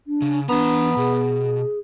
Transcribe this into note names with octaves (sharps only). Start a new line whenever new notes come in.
D4
C#3
E3 B3 D4 A#5
B2 G#4